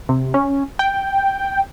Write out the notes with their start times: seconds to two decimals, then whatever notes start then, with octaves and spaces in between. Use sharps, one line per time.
0.09 C3
0.34 C#4
0.79 G5